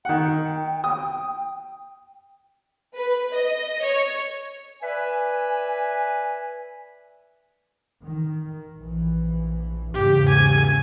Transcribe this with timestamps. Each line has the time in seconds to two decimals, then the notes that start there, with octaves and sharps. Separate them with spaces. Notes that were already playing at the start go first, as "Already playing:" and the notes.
0.05 D#3 F#5 G5
0.84 D#6
2.96 B4
3.33 D#5
3.83 C#5
4.82 B4 D5 E5 G#5
8.02 D#3
8.78 A#1 E3
9.95 E2 G#2 C#3 G4
10.29 G#5